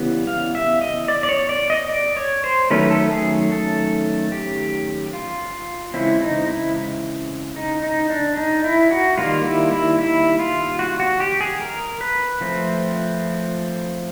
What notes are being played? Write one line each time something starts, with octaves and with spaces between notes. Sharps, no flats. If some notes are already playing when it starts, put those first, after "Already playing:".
Already playing: C#3 E3 G3 B3
F5
E5
D#5
D5
D5
C#5
D5
D#5
D5
C#5
C5
D#3 F#3 A3 C#4 B4
A4
G#4
A4
G4
F4
C#3 E3 G#3 C4 E4
D#4
E4
D#4
D#4
D4
D#4
E4
F#4
D#3 G3 A#3 F4
E4
E4
E4
F4
F#4
F#4
G4
G#4
A#4
B4
F3 A3 C4